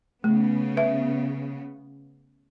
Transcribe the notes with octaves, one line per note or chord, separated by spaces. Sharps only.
C#3 A3 B3
B4 E5